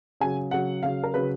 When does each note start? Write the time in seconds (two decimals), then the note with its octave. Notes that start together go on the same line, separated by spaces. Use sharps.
0.21 C#3 F#3 G#5
0.51 C#3 F#3 F#5
0.83 C#3 F#3 F5
1.03 A#4
1.14 C#3 F#3 B4